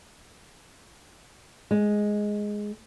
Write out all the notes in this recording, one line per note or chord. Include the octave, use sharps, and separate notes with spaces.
G#3